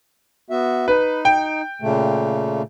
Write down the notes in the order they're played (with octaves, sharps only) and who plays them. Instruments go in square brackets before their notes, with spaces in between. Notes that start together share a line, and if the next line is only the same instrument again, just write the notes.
[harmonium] B3 F#4 E5
[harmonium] D#4 [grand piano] B4
[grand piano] G5
[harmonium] A#2 C#3 A3